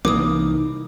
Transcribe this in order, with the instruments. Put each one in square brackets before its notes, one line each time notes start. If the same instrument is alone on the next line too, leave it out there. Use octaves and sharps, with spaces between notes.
[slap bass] C2 E3 A#3 [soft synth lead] D#4 [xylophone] D6 D#6